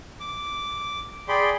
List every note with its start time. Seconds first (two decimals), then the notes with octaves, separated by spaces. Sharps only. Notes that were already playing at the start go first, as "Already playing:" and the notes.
0.20 D6
1.28 G#4 D5 G5 B5 C6